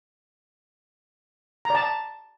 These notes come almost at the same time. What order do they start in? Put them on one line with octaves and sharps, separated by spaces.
A#5 D5 A5